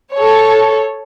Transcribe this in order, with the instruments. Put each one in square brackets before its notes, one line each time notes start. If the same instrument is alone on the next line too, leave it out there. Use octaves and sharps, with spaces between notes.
[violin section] A4 C#5